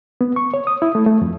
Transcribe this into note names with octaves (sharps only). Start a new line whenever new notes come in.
B3
C#6
C#5
D#6
E4
A3
A3
F2